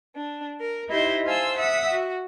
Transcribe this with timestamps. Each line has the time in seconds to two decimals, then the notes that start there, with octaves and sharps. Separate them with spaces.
0.14 D4
0.60 A#4
0.89 D#4 E4 G4 C5 D#5
1.24 C5 F5 G#5 A5 C6 E6
1.57 E5 F#5 D#6 E6
1.90 F#4